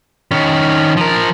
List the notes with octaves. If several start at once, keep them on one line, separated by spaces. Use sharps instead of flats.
D#3 C#4
F3 A#4